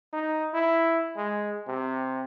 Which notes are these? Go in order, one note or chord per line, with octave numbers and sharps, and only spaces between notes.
D#4
E4
G#3
C3